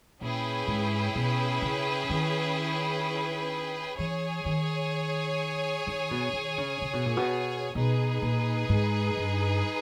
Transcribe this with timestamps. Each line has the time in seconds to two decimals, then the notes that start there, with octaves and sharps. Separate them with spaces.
0.21 A#2 C#4 E4 G#4 B4 G5
0.67 G#2
1.15 B2
1.62 C#3
2.10 D#3
3.98 E3 G#4 C#5 G#5
4.45 D#3
5.87 D#3
6.11 B2
6.33 D#3
6.58 C#3
6.82 C#3
6.93 B2
7.05 A#2
7.17 B2
7.75 B2 D#4 G#4 B4
8.22 A#2
8.69 G#2
9.17 G2